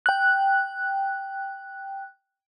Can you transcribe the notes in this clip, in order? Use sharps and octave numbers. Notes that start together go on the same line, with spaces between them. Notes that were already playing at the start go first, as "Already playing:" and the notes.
G5 F#6